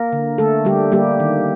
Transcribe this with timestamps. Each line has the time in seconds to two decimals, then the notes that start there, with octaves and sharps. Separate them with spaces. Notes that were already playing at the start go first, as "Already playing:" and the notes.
Already playing: A#3 A#4
0.12 D3
0.38 D3 A3 A4
0.65 D3 G3 G4
0.92 G3 A#3 G4
1.20 D#3